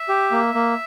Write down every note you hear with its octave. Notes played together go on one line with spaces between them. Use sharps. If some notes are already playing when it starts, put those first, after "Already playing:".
Already playing: E5
G4
A#3
A#3